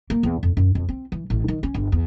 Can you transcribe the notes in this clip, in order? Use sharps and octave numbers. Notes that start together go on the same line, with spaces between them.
A#3
E2
F2
F#2
F2
C4
E3
A1
D#3
C#4
G1
E2